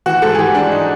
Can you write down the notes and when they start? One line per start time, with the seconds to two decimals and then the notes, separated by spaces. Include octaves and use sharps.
0.06 E3 F#4
0.22 G#2 A4
0.35 G#4
0.38 E3 G4
0.54 G#2 D4
0.71 D#4